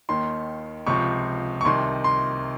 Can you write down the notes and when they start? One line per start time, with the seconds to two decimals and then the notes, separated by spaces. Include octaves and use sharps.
0.09 D#2 D#3 C6
0.87 C#2 C3 F3 C#6
1.61 C#6
1.65 C2 C3 D#3 C6
2.04 C6